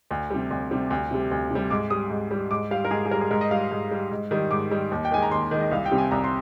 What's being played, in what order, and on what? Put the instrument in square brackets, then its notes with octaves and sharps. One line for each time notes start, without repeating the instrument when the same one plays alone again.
[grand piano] D2
C3 G3
D2
C3 G3
D2
C3 G3
D2
C3 G3
G#2 D6
G3 D#6
G#2
G3
G#2 D6
G3 F5
A#4
G#2 G#4
G#4
G3 A#4
G#4
G#2 A#4
D#5
G3 F5
G#2
G3
G#2
D#3 G3
G#2 D6
D#3 G3
D#2
G5
D#3 G#3 G#5
A#5
D#2 C6
D#3 G#3
D#5
C2 F5
G5
C3 G3
G#5
C2 A#5
C6